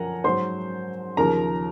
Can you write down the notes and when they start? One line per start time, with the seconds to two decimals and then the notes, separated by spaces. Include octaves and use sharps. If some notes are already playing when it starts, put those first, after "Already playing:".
Already playing: F#2 F3 A#4 F#5 G#5 A#5
0.24 G#2 F#3 C5 C6
1.17 D#2 C#3 F3 A#4 A#5